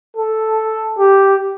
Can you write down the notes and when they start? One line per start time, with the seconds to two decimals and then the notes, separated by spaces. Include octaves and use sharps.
0.17 A4
0.99 G4